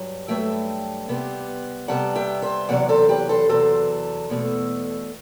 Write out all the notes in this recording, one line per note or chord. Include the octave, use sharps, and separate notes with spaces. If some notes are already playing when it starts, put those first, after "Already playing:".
Already playing: G2 F#3
G2 F#3 A3 E5 G5
C3 G3 B3
C3 G3 B3 F#5 A5
E5 G5
C5 E5
E2 C3 F#3 D5 F#5
A4 C5
G4 B4
A4 C5
E2 C3 F#3 A4 C5
E2 B2 A3